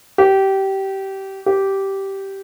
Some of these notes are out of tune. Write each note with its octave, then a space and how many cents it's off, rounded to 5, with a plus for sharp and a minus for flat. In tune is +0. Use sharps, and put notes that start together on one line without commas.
G4 -20
G4 -10